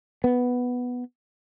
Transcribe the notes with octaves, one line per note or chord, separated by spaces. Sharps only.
B3